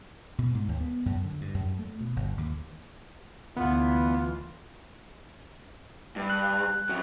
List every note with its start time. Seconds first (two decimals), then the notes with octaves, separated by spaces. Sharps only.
0.38 B2
0.55 G#2
0.68 D#2
0.80 B3
1.06 F#2
1.25 D3
1.41 G2
1.54 F#2
1.79 A3
2.01 B2
2.16 G1
2.37 D#2
3.57 D2 E3 B3 F4
6.16 G2
6.29 F#6
6.89 F2 F#3